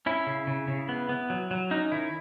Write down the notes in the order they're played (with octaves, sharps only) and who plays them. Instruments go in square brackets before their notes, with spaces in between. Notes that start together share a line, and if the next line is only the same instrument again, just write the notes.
[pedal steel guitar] C#4 E4
C#3
C#3
C#3
B3
B3
F#3
F#3
C#4 D#4
D#3 E4